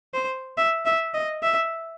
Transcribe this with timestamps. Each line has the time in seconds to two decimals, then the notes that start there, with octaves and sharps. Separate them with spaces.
0.14 C5
0.57 E5
0.86 E5
1.14 D#5
1.43 E5